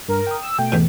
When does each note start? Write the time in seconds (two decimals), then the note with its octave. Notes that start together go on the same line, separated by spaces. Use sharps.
0.08 G2 A#4
0.27 G5 D#6
0.42 E6
0.59 B2 A3 G5
0.72 E2 A2